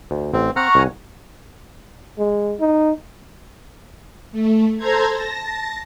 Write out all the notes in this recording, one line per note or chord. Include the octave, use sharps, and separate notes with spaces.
D2
A1 C4
C4 F#5 A#5 C#6 F6
C2 G#5
G#3
D#4
A3
A4 C5 A#5 G#6
A5 A#6